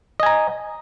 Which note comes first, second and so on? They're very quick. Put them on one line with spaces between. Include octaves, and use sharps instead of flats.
D#5 G#5 A#5